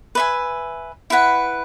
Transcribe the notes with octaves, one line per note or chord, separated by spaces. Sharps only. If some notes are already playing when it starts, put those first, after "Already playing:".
B4 E5 G#5
E4 B4 F#5